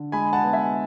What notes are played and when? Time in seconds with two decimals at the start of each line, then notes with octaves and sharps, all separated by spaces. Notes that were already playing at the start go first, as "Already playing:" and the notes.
Already playing: D3
0.12 G#3 G#5 B5
0.33 F#5 A5
0.42 B3
0.53 E5 G#5